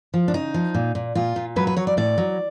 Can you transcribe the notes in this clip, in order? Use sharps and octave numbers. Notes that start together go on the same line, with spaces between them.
F3
D4
C#3 D#4
F3
A#2
A#2
A#2 F4
A#2
F#3 B4
B4
F#3 C#5
D5
A2 D5
F#3